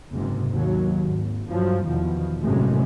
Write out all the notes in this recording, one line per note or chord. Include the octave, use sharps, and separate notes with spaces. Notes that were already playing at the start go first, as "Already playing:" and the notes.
F#1 G#2 C3
D#2 F#3
G#1
G2 F3 F#3
E2 B2 D#3 F3
G1 F#2 A2 C3 G#3 A3